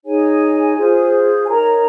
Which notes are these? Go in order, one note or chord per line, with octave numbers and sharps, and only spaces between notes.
D#4 G#4 C#5 G#5
F4 G#4 C5
G#5
D#4 A#4 C#5 A#5